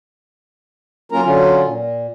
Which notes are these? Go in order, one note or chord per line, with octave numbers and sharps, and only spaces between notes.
F#3 A#3 C#4 F4 A#4 A#5
D3 F#3 C#4 F4
A#2